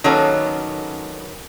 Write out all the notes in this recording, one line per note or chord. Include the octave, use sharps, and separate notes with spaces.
D#3 F#3 A#3 B3 C#4 A4